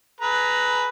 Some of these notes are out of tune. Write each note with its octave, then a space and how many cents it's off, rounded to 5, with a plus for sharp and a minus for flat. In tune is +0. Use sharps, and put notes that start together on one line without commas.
G#4 +35 B4 +0 A#5 +0